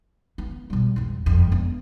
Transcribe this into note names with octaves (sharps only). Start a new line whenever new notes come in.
B3
B2 G3
A1 E2
F#1 F2
B3 D4